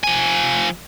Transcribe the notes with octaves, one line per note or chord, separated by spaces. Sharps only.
F3 G#5